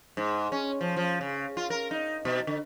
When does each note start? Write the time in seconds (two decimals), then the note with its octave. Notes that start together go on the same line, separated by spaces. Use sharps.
0.17 G#2
0.52 C#4
0.81 F3
0.96 F3
1.21 C#3
1.57 F4
1.70 A#4
1.91 D#4
2.25 B2
2.47 D3